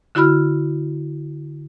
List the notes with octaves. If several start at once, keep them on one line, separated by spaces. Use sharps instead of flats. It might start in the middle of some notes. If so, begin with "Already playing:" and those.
D3 E4 F#4 B5 F6